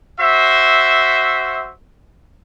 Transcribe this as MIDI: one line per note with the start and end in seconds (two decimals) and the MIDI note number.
0.19 1.72 66
0.19 1.72 72
0.19 1.72 76